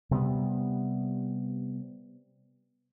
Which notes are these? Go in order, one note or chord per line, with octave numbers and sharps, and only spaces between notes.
C3 G3 A3 B3